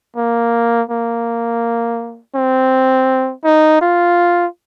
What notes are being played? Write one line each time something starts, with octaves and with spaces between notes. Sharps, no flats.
A#3
A#3
C4
D#4
F4